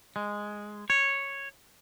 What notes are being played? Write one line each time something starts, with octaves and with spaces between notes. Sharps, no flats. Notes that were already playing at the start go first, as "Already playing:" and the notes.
G#3
C#5